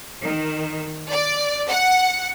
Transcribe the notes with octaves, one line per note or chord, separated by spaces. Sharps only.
D#3
D5
F#5